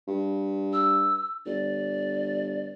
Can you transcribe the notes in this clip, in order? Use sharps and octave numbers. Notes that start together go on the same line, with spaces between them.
G2
E6
G1 D5